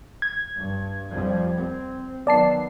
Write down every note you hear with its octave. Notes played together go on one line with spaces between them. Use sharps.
G#6
G2
F2 F3 G3
C4
D#3 F#3 B3 D5 A5 C7